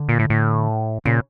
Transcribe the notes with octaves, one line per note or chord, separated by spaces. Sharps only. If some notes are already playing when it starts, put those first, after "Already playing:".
Already playing: D3
A#2
A2
A2
A#2 C#3